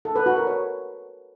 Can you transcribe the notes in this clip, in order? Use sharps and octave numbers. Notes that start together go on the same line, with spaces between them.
A4
B4
F#4
A#4
C#5